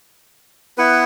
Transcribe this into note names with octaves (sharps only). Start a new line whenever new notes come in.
B3 E4 B4 F#5